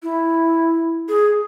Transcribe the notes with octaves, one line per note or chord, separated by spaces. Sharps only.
E4
G#4